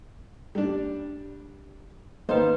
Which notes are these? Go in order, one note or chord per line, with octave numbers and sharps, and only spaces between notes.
G3 D4
D#3 A#3 B4 C5 D#5